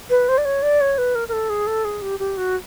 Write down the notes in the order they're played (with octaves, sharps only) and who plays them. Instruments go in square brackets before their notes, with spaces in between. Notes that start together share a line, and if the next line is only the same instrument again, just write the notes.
[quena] B4
C5
D5
C#5
D5
C#5
B4
A#4
A#4
A4
G#4
A4
G#4
G4
G4
F#4